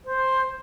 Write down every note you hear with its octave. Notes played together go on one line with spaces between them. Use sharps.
C5